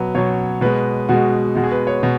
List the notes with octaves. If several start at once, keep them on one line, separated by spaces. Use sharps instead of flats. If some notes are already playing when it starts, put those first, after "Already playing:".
Already playing: B2 F#3 B4
B2 F#3 C#5
B2 G#3 B4
B2 G#3 F#4
B2 G#3 F#4
G#4
B4
C#5
B2